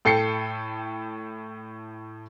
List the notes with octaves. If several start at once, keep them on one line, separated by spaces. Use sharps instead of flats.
A2 A4 G5 C7 C#7